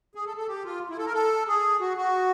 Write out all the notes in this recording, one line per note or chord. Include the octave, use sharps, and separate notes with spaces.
G#4
A4
A4
G4
F4
E4
A4
A#4
A4
G#4
F#4
F#4